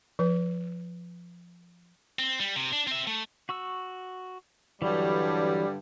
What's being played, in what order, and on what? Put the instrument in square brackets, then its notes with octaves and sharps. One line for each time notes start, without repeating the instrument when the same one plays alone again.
[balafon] F3 B4
[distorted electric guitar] C4
G3
C3
D4
C4 E5
A3
[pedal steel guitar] F#4 C#6 E6
[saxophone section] G2 D3 G3 [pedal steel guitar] E3 F#3